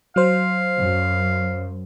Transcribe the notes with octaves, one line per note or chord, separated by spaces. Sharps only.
F#3 C5 F5
F#2